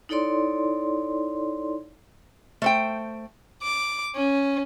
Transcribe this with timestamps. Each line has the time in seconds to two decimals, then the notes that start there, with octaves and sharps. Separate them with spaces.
0.09 D#4 E4 A4 C#5 D5 C6
2.62 A3 C5 G5
3.63 D6
4.16 C#4